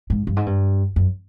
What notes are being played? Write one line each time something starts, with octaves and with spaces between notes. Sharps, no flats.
G#2
G2
G#2
G2
F#2